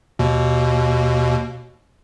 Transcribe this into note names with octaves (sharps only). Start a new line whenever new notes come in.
D#2 B2